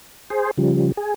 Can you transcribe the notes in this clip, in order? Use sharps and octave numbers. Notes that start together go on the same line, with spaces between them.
G#4 C5
C#3 F3 G3
G#4